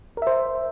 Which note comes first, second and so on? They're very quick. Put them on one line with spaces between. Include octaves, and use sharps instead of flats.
A#4 E5 C5